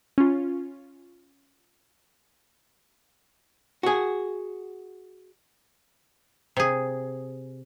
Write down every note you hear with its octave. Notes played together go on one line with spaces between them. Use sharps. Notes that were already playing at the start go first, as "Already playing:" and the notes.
C#4 F4
F#4 G#4
C3 G#4